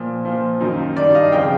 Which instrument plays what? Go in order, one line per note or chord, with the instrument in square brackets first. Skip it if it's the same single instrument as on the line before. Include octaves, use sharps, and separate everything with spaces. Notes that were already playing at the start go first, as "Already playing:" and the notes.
Already playing: [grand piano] A#2 F3
A#2 F3
F#2 D#3
G2 D#3 D5
D#5 F5
F2 C#3 F3 F5 G5